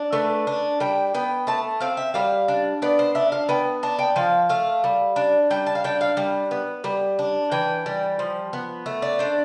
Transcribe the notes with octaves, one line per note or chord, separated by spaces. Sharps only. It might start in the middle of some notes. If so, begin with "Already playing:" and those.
Already playing: D4
A3 B4
D4
G3 G5
B3 G5
A3 A5
C4 F5
E5
G3 F5
D4
B3 D5
C5
D4 E5
F5
B3 G5
D4 A5
G5
F3 F5
A3 F5
G3
D4
G3 G5
A5
F5
D4 G5
F5
G3
B3
G3
D4
E3 G5
G3
F3
B3
A3
D5
D4 C5